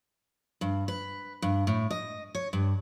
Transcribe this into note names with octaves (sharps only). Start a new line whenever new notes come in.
G2
B4
G2
A2
D#5
C#5
G2